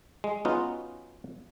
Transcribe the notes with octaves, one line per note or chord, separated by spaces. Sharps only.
G#3
B3 C#4 D#4 F4 F#4